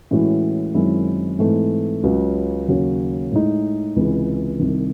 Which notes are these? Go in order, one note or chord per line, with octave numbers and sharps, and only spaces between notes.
A2 E3 G#3 C#4 F#4
F#2 D#3 G#3 C4 E4
G#2 E3 A3 C4
C#2 C#3 F#3
D#2 C#3 F#3
A2 G#3 D#4
C#2 C3 E3 G#3
C2 C3 D#3